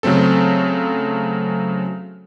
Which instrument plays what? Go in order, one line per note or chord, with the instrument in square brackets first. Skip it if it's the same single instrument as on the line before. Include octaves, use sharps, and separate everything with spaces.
[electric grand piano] C#3 F#3 A3 C4 A4